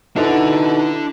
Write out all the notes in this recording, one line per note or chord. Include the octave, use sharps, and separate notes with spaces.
B2 D4 E4 A4 C5 F#5
D#4